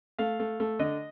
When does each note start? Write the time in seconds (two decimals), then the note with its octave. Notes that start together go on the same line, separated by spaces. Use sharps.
0.19 A3 F5
0.40 A3
0.60 A3
0.79 D3 D#5